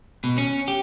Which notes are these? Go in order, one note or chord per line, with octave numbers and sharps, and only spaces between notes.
B2
C#4
G4